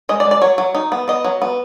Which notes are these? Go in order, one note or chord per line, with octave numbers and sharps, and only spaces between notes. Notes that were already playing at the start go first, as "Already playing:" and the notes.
G#3 D#5
D5
G#3
D5
F#3 C#5
F#3
D#4
B3
B3 D#5
F#3
B3